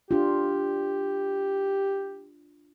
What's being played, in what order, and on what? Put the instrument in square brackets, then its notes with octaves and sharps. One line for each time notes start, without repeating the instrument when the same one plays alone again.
[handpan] D4 F4 [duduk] G4